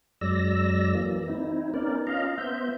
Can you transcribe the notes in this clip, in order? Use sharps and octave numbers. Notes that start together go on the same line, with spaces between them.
F#2 F#3 G#3 D5 E6 A#6
E3 F#3 A#3
C4 D#4 E4
B3 C#4 D#4 A#4 D5
C#4 F4 D#5 F5 A#5
B3 C5 E5 G6